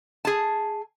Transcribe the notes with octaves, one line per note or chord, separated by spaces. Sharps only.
G#4 A5